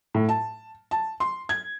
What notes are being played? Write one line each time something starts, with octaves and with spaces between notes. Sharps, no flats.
A2
A5
A5
C6
G#6